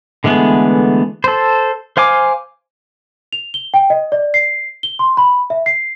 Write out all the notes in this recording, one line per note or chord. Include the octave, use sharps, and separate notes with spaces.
D3 E3 G#3 A3 B3
A4 C5
C5 F5 G#5 D6
F7
G7
G5
D#5
D5
C7
G7
C6
B5
E5
C7